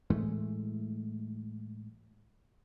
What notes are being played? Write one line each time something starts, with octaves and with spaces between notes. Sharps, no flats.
A2 E3 G#3 A3